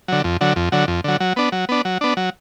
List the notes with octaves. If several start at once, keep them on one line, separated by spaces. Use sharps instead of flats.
D3 F#3
F2
D3 F#3
F2
D3 F#3
F2
D3 F#3
F#3
B3 D4
F#3
B3 D4
F#3
B3 D4
F#3